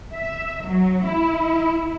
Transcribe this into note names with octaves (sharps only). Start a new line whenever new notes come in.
E5
F#3
E4